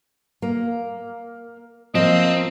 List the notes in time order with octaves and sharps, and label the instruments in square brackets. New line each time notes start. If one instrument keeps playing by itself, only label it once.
[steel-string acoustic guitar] A#3
[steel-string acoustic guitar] F3 A#3 [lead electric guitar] C4 [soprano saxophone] D#5